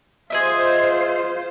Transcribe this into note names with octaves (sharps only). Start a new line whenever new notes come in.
F4 G#4 C5 D#5 E5